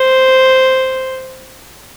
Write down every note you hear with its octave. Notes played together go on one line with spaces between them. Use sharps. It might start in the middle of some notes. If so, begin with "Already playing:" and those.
Already playing: C5